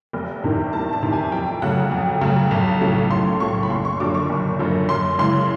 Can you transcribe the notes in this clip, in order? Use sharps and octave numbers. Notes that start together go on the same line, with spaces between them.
F1
E2 C3 D#3
F1 A5
A5
E2 C3 D#3
G#5
F2 G5
C#3 F#3 A3 F#5
F2
C#3 F#3 A3
B1
A2 F3 A3 C#4
B1 C6
A2 F3 A3 C#4 C#6
B5
F#1 C6
C#6
F#2 D3 F3 D6
C#6
F#1
F#2 D3 F3
F#2 C6
C#3 E3 G#3 C6